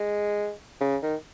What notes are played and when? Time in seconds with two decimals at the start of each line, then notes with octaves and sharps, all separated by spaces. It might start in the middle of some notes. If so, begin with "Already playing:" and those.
Already playing: G#3
0.81 C#3
1.03 D#3